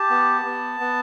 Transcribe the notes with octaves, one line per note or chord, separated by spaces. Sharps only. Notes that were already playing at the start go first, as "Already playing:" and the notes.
Already playing: G4 A5
B3
B3
B3